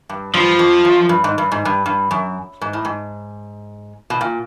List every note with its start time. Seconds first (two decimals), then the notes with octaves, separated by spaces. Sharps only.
0.09 G2
0.34 G2 F3
0.59 F2
0.85 F#2
1.09 G2
1.24 G#2
1.38 G2
1.52 G#2
1.65 G2
1.86 G2
2.11 F#2
2.61 G#2
2.73 A2
2.85 G#2
4.10 B2
4.21 A#2